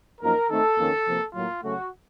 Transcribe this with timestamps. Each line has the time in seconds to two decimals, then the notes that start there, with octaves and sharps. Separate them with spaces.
0.21 F#2 F3 A#3 D#4 A#4
0.49 D#3 A3 C4 D#4 A4
0.78 F2 D#3 A#3 C#4
1.06 C3 F3 A#3
1.34 A2 F#3 A#3 F4
1.63 C#3 F#3 A3 C#4 F#4